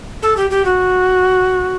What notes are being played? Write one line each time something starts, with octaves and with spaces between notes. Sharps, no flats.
A4
G4
G4
F#4